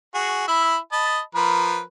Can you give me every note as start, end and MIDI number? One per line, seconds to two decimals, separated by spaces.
0.14 0.43 66
0.14 0.43 68
0.48 0.77 64
0.48 0.77 76
0.48 0.77 83
0.92 1.20 75
0.92 1.20 81
0.92 1.20 83
1.35 1.81 53
1.35 1.81 70
1.35 1.81 71